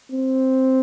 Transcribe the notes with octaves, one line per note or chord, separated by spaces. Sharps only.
C4